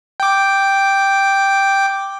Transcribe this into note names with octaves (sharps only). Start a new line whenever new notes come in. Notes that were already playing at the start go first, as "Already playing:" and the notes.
G5 D6